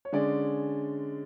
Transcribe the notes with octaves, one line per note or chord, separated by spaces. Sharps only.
C#5
D3 G#3 C#4 D5